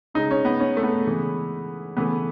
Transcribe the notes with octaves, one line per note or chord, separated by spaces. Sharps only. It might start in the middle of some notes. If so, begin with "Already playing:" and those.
C#3 G#3 D#4
C#4
B3
C#4
A3
B3
C#3 E3 G#3
C#3 E3 A3 B3